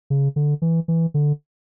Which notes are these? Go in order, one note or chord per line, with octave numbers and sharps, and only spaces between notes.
C#3
D3
E3
E3
D3